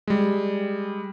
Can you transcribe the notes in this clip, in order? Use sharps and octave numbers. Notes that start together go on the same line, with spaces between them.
G3 G#3